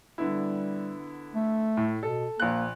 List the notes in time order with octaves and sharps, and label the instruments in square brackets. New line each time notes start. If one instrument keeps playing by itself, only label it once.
[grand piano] D3 B3 E4 [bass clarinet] G3
[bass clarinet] A3
[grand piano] A2
[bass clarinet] B2 [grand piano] A4
[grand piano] A#1 F#6 [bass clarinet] A#3